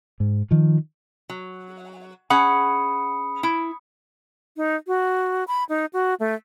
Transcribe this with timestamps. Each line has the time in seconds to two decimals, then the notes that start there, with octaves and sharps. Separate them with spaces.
0.20 G#2
0.51 D#3 F3
1.29 F#3
2.30 C#4 G#4 F#5 B5 D#6 C#7
3.43 E4
4.57 D#4
4.87 F#4
5.48 B5
5.69 D#4
5.93 F#4
6.20 A3